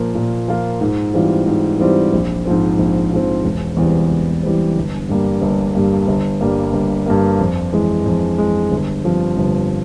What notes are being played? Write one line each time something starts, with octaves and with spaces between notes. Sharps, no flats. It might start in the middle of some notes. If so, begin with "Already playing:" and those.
Already playing: A#2 F3 A#3 F4 A#4
A#2
F3 A#3 F4 A#4
G#2
E3 G3 C4 F4
G#2
E3 G3 C4 F4
A#1
G#2 F3 C4
A#1
G#2 F3 C4
E1
E2 E3 G3 C4
E1
E2 E3 G3 C4
G1
G2 G3 A#3
G1
G2 G3 A#3
G1
G2 G3 A#3
G1
G2 G3 A#3
F2
E3 G#3
F2
E3 G#3
G1
G2 F3 C4
G1